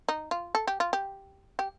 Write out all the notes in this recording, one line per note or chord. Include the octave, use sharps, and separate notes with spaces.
D#4
F4
A4
G4
F4
G4
G4